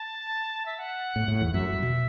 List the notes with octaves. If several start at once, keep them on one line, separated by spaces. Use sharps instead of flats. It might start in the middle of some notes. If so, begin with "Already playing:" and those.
Already playing: A5
E5
F#5
A2
A2
E2
F#2 E5
F#2
B2